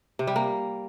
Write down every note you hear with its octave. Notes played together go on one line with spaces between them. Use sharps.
C3
G3
A#3